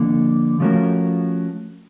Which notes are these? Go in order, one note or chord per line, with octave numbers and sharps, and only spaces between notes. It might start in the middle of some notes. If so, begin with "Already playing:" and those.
Already playing: D3 F3 A#3
F3 A3 C#4 F#4 A#4